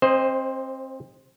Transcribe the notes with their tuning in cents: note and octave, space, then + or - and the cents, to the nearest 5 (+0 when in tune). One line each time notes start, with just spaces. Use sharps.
C4 +30 C5 +0 D#5 +0